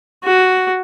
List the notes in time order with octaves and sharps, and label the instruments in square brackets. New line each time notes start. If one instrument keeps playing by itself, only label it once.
[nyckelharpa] F#4